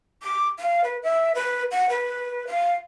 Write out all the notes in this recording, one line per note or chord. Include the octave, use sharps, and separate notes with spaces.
D6
F5
B4
E5
B4
F#5
B4
F5